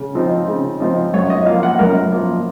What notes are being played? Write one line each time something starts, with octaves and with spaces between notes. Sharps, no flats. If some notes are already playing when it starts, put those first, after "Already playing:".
Already playing: C#3
F3 C4 D#4
C#3
F3 C4 D#4
F#2 C#5
D#5
F3 A#3 F5
F#5
F#2 A#4
F3 A#3